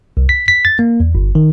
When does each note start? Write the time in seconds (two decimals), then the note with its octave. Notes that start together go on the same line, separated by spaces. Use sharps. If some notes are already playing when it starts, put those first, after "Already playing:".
0.17 C2
0.29 B6
0.48 B6
0.65 A6
0.79 A#3
1.00 E2
1.15 G1
1.35 D#3